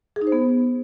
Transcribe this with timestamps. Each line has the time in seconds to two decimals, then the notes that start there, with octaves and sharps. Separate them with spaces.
0.16 G#4
0.22 D#4
0.27 C5
0.32 B3